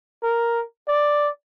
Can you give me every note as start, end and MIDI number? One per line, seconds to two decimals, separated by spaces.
0.23 0.64 70
0.88 1.29 74